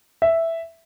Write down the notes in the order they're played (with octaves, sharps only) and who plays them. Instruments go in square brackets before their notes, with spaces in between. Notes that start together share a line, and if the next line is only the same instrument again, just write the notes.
[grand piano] E5